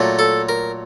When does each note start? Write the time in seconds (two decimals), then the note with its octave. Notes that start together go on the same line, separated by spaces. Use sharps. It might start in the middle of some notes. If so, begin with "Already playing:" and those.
Already playing: A#2 F#3 A3
0.19 A4
0.49 A#4